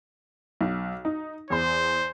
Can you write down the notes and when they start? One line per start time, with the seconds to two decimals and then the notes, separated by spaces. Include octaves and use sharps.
0.61 B1
1.05 D#4
1.50 E2 C5 C6